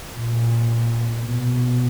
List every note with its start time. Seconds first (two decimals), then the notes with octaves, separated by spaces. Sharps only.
0.16 A#2
1.23 B2